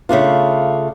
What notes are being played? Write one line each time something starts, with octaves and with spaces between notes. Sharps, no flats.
C#3 A3 D4 F4